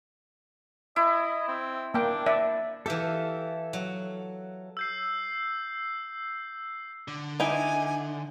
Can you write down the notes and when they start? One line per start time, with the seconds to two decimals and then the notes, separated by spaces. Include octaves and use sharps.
0.96 E4 D#5
1.48 C4
1.94 A#3 D4 G5
2.26 D5 E5
2.86 E3 G4 A4 E5 F5
3.73 F#3
4.77 E6 G6 C7
7.08 D3
7.40 D#4 E4 G5 G#5